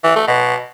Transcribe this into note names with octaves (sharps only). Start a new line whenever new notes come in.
E3
A3
B2